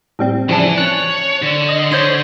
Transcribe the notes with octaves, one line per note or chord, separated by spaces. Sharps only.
A2 G3 C4
C#3 E3 F3 D4
C#5 A5 F#6
D3
D#5
D3 C5 C#5 C6